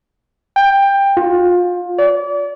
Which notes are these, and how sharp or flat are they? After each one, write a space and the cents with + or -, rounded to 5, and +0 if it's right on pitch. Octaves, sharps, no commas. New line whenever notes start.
G5 +15
F4 +25
D5 -35